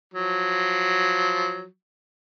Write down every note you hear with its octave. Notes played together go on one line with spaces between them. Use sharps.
F3 F#3